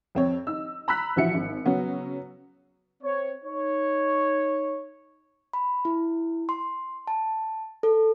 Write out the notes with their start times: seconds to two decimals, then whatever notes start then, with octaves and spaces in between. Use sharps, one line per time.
0.15 F2 C4 C#5
0.47 D#4 E6
0.88 A#5 B5 E6 F#6 B6
1.16 A#1 E3 F3 F#4 E5 C#7
1.34 G#1
1.65 C#3 F#3 B3 C#4
3.03 C4 C#5
3.44 D#4 C#5
5.53 B5
5.85 E4
6.49 C6
7.07 A5
7.83 A4